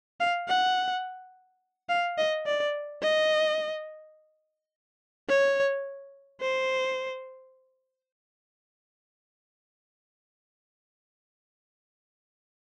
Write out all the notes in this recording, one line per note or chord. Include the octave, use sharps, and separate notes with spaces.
F5
F#5
F5
D#5
D5
D#5
C#5
C5